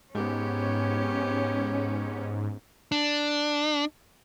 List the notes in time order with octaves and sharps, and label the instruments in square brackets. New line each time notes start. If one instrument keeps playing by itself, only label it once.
[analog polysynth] G#2 [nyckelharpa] B3 G4 [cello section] C#4
[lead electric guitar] D4